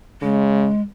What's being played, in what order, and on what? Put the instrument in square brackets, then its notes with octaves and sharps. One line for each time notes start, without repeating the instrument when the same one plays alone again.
[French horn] C#3 [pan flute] G#3